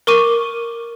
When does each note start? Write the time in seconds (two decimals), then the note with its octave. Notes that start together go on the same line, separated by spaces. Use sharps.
0.07 A#4 C#6 D6 D#7